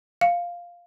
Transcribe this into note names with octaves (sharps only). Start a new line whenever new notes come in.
F5